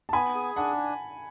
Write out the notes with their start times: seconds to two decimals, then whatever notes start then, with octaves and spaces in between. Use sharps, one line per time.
0.09 A5
0.13 B3 G#5 B5
0.35 G#4
0.56 D4 F#5 A5